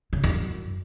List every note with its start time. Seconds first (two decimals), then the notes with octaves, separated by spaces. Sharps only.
0.13 C#3
0.24 E2
0.35 F#2